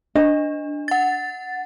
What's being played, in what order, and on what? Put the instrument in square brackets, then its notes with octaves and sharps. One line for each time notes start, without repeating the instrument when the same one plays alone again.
[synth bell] D4 [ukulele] D#5
[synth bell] F#5 A6